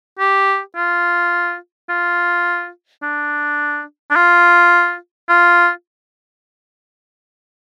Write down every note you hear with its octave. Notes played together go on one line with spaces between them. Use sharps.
G4
F4
F4
D4
D4
F4
F4